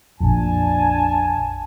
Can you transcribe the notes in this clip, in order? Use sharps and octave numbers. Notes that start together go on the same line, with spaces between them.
A#1 F2 D4 G#5 A5